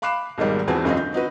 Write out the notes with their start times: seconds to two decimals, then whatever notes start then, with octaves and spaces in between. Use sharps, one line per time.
0.02 F5 B5 D6 F#6 C7 E7
0.38 B1 G#2 D#3 G3 A#3
0.68 E2 E3 C4 F#4 C5 A5
0.84 E1 F#2 G#3 C4 F4 D#5
0.96 D3 G6
1.13 C4 D#4 F#4 B4